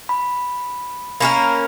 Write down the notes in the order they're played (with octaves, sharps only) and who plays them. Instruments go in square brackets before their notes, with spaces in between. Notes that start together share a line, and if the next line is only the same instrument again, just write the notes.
[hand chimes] B5
[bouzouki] A#3 C#4 G4 A#4 [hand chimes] B5